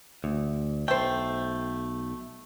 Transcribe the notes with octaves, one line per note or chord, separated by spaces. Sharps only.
D2
B1 A3 C5 G5